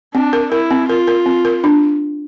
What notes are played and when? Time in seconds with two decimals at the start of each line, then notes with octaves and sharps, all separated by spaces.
0.15 C4 D4
0.33 A#4
0.52 E4 A#4
0.71 C4
0.89 F4 A#4
1.08 A#4
1.26 C4
1.45 A#4
1.64 D4